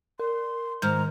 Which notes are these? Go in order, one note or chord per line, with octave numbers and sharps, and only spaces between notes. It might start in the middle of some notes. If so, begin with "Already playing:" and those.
A#4 C6
G#2 D#3 A#5 F6